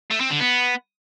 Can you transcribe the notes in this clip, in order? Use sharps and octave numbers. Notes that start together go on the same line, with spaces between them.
A3
C4
D3
B3